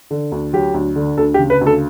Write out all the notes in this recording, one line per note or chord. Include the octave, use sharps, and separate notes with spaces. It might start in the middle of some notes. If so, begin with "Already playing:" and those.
D3
D2
F#3 G4
D2
D3
D2 A4
G4
C#3
B4
D2
A4